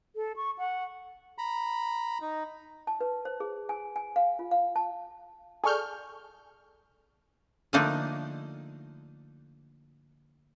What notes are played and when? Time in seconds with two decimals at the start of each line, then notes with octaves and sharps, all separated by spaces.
0.16 A4
0.36 C#6
0.58 F#5
1.38 A#5 B5
2.21 D#4
2.87 A5
3.01 B4
3.25 C5
3.40 G#4
3.69 G#5
3.96 G#5
4.16 F5
4.39 F4
4.51 F5
4.76 A5
5.64 G#4 A4 D5 C#6 F6 G6
7.73 D3 F3 A3 A#3 D4 D#4